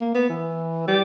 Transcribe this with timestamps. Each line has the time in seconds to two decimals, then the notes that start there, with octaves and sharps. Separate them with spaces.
0.01 A#3
0.15 B3
0.30 E3
0.88 G3